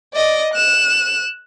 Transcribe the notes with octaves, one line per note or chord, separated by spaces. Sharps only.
D5 D#5
F#6 E7